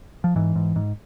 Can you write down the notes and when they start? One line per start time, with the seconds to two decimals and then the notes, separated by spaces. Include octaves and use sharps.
0.24 F3
0.36 G#2 E3
0.55 G#2
0.76 G#2